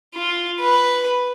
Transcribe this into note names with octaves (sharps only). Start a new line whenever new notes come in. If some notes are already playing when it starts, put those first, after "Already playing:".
F4
B4